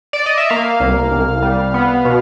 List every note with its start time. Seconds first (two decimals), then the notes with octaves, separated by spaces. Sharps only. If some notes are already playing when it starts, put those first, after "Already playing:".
0.13 D5
0.26 D#5
0.38 E5
0.50 A#3 F5
0.80 C2
1.11 C2
1.42 G3
1.74 B3
2.05 B2